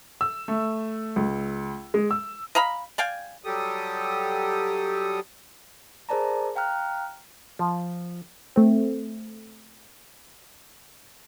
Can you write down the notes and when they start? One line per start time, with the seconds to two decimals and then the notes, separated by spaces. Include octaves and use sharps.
0.21 E6
0.48 A3
1.16 C#2
1.94 G#3
2.11 E6
2.55 D#5 F5 A#5 B5
2.98 D5 F5 G5 G#5
3.44 F#3 G3 G4 A4 D#6
6.09 G#4 A#4 C5 D5 A5 A#5
6.56 F5 G5 A#5 F6 F#6
7.59 F3
8.56 A3 C4